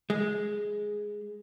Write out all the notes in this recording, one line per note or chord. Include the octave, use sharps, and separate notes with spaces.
G#3